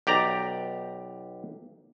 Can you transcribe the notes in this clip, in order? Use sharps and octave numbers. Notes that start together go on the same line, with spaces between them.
B1 G4 D5 A#5